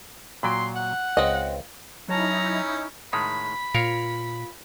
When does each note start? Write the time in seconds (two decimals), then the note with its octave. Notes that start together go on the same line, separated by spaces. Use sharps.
0.43 A#2 F#3 G5 C6
0.75 F#5
1.17 C#2 C4 D#5
2.08 F#3 C#4 D#4 E4 C#5 A5 A#5
3.13 A2 D#3 G#3 B5
3.75 A#2 F4 A#4 C#5 F5